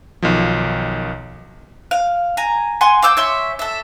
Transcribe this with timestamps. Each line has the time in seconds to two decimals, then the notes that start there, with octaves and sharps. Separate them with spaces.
0.22 B1 D#3 F3
1.91 F5
2.37 G#5 A#5
2.81 F#5 G#5 C6
3.02 F5 D6 E6 G6
3.17 C#5 E5 C6
3.59 A4 E5